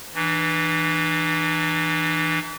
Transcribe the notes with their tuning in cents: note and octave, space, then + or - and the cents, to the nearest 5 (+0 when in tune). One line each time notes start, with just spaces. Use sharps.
E3 -10 D4 +45